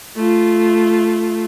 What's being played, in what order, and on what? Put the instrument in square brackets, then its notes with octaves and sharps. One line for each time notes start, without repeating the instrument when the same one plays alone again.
[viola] A3 F4